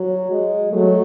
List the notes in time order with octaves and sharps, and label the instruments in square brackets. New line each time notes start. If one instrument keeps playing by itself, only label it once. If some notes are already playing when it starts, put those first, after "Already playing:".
Already playing: [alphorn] F#3
G#3
[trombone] F#3 [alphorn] A3